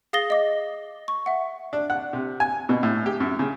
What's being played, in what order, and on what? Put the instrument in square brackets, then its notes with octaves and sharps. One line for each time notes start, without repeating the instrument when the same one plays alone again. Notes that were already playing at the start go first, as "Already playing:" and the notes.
[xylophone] G#4 F5 D#6 A6 A#6 G7
D#5 D6
C#6
E5 F#5
[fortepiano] D4
F#5
C3
G#5
B2
A2
G4
F#2
C#3